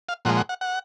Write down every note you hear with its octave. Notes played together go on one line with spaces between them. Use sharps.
F5
A#2 F3 G#3 F#5
F#5
F#5
F#5